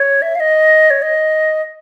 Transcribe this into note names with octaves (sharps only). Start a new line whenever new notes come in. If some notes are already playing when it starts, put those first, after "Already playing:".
Already playing: C#5
E5
F5
D#5
C#5
D#5